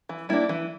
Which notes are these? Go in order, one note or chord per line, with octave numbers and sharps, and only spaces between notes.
E3
G3 A#3 D4 E4
E3